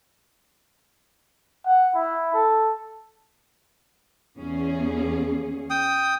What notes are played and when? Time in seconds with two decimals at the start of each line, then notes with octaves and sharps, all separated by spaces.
1.66 F#5
1.95 E4
2.34 A4
4.37 E2 C#4 G#4
5.70 G5 D#6